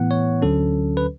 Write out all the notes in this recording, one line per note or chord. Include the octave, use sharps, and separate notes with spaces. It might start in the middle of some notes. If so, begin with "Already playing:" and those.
Already playing: A2 E3 B3 F#5
C#5
D2 D3 F#3 C#4 A4
B4